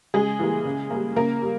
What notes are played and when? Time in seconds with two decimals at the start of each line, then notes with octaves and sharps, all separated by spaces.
0.14 C#3 G#3 G#4
0.39 E3 G3 A#3
0.65 C#3
0.90 G3 A#3
1.16 C#3 A#3 A#4
1.42 G3